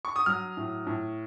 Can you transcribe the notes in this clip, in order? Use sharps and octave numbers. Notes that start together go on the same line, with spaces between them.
C#6
D#6
F#3 F6
A2
A2